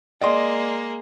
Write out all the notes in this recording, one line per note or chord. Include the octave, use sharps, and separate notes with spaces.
G#3 A#3 D5 D#5 C6